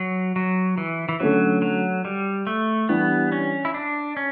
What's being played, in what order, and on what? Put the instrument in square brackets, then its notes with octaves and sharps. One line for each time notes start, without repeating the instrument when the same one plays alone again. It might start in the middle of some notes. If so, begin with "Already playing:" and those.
Already playing: [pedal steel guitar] F#3
F#3
E3
E3
[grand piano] D3 A3 C#4 [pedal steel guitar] F#3
[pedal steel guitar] F#3
G3
A3
[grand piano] E3 G3 D4 G4 D5 [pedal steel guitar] B3
[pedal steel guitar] C#4
E4
D4
C#4